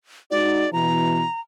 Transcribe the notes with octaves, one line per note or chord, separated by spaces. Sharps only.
G#3 D#4 F#4 D5
B2 E3 A#5